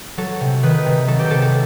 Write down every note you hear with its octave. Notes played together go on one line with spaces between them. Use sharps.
F#3 A4
C3
D#3 B4
C3
F#3 A4
G4
C3 A4
A4